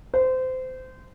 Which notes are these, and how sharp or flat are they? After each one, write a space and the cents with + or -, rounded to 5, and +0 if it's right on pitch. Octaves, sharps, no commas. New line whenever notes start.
C5 -25